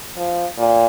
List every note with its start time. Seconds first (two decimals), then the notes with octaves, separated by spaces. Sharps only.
0.17 F3
0.58 A#2